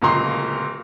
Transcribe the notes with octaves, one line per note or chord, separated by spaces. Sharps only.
D1 C#2 A#2 A#5 C6